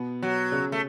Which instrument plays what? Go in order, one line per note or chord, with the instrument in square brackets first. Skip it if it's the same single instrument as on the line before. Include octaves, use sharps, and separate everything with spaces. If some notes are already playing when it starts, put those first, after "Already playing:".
Already playing: [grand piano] B2 B3
[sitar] F#3
[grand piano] C#3 C#4
[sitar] A3